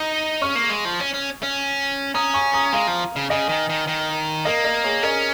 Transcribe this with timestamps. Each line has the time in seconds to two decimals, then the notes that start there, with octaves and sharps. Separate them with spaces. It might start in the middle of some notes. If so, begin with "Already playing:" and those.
Already playing: D#4 A#5 D#6
0.41 C#4 C#6 F6
0.56 A#3
0.70 G#3
0.85 F3
1.00 C#4
1.14 C#4
1.43 C#4
2.14 C#4 A#5 D#6
2.34 G#5 C#6
2.53 A#5 D#6
2.73 G#3 F5 A#5
2.87 F3
3.16 C#3
3.30 C#3 D#5 G#5
3.49 D#3
3.69 D#3
3.87 D#3
4.45 A#3 A#4 D#5
4.64 A#4 D#5
4.84 G#4 C#5
5.03 C#4 A#4 D#5